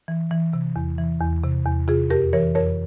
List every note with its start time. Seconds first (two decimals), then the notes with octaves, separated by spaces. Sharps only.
0.08 E3
0.31 E3
0.53 C3
0.76 E2
0.98 E3
1.21 E2
1.43 C3
1.66 E2
1.88 C3 F4 G#4
2.10 F2 G4 A#4
2.33 E3 A#4 C#5
2.55 F2 A#4 C#5